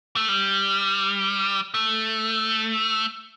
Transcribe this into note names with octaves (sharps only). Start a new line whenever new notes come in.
A3
G3
A3